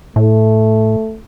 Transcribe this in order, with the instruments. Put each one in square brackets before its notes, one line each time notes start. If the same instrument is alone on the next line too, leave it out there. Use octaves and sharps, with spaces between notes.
[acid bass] A2 [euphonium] A3